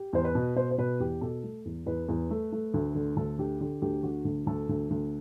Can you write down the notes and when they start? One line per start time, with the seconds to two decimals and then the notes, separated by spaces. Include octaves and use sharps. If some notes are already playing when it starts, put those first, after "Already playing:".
Already playing: G4
0.13 E2 C5
0.24 B4
0.35 B2
0.56 B2 C5
0.71 C5
0.78 B2 B4
1.00 E2 G4
1.21 B2 A4
1.43 A3
1.65 E2
1.86 E2 B4
2.09 E2
2.31 A3
2.52 A3
2.74 D2
2.95 D3
3.16 D2 A4
3.39 D3 G4
3.61 D3 G4
3.82 D2 G4
4.03 D3 F#4
4.25 D2
4.46 D2 A4
4.69 D2
4.90 D2